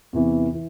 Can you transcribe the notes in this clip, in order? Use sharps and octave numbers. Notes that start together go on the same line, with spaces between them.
E2 C3 E3
E3